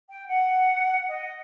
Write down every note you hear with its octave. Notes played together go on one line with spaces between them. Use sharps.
G5
F#5
D#5